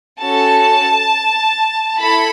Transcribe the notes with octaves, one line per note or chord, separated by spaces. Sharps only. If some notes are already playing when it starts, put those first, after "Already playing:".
C#4 F#4 A4 A5
E4 A4 B5